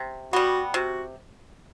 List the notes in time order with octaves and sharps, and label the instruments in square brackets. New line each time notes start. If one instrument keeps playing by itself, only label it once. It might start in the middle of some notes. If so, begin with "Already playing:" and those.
Already playing: [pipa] C3
[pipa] G3 B3 [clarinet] F#4
[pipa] C3 [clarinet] F#4